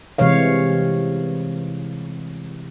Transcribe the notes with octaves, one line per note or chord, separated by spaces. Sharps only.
C3 E3 G#3 C#5 F5